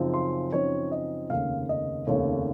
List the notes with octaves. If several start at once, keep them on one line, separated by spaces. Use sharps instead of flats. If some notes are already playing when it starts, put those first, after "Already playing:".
Already playing: F#2 C#3 F3 C4 D#4
C6
F#2 C#3 F3 C4 D#4 C#5
D#5
F1 D#2 C#3 F5
D#5
F1 D#2 C#3 C#5